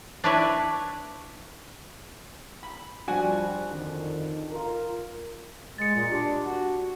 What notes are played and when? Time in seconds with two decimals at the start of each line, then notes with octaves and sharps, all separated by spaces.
0.24 D4 E4 B4 C#5 D5 E5
2.63 B5
3.08 F3 G3 D4 F#4 G#5
3.70 F2 D3 D#3
4.51 F4 A#4
5.78 G#3 A6 C#7
5.95 A#2
6.12 D4 G4
6.44 F#4